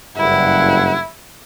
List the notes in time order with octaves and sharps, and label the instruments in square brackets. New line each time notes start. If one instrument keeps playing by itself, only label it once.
[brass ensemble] F#1 G2 F#5 [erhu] E4